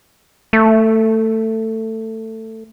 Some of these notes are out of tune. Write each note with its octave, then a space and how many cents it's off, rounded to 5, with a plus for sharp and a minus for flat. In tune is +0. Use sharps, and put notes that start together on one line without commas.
A3 +15